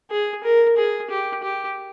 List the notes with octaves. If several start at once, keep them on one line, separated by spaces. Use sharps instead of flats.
G#4
A#4
G#4
G4
G4